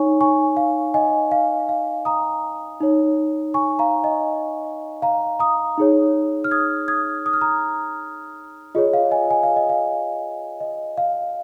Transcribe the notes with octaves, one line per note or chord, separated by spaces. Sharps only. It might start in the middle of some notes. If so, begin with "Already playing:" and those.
Already playing: D#4 C#5 G#5 C#6
G#5 C#6
F5
D#5 G#5
F5
F5
A#5 D#6
D#4 C#5
G#5 C#6
F5 A#5
D#5 G#5
F5 A#5
A#5 D#6
D#4 G#4 C#5
F6
D#6 G#6
D#6 G#6
D#6
F6
A#5 D#6
F4 G#4 C#5 D#5
F5
D#5 G#5
G#5
F5
D#5
F5
D#5
F5